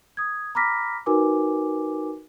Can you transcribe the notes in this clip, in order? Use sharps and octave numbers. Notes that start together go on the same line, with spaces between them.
D#6 G#6
A#5 B5 D6 F6 A#6 B6
D#4 F#4 A#4 B4 G#5 D6